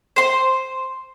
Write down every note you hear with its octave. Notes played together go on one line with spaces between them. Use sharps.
C5 C6